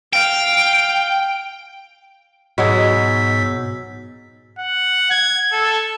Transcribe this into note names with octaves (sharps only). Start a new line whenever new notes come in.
F5 G5
G#2 B2 F#3 G#4 E6 B6
F#5
G#6
A4